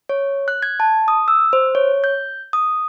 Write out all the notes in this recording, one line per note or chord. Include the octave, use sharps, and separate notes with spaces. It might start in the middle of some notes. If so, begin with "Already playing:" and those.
C#5
F#6
G#6
A5
D#6
E6
C5
C#5
G6
D#6